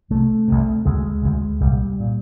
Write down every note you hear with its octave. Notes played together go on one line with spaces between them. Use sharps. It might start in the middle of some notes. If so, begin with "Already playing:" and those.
C2 C3 A3
C2 C3
D2 C#3 G#3
D2 C#3
C2 A#2 G3
A#2